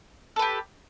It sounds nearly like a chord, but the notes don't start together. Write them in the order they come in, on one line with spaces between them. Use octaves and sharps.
A4 B4 G4